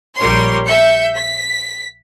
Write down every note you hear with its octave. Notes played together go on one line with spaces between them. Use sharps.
A#1 G3 A#4 C#5 C6
E5 G6 C#7
B6